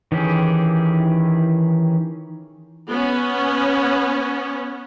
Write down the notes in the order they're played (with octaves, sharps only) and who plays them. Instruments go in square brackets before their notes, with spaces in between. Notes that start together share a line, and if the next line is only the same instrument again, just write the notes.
[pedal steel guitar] D#3 E3 C#4 G4 G#4
[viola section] B3 C#4